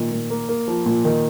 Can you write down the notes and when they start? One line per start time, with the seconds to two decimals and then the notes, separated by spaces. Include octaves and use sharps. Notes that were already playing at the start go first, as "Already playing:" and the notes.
Already playing: A#2 D#3
0.12 A#2
0.30 A#3
0.49 A#3
0.68 F3
0.86 A#2
1.05 D#3